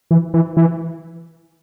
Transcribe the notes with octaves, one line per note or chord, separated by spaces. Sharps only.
E3
E3
E3